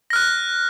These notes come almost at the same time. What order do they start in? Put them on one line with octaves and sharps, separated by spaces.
A#6 F6 F#6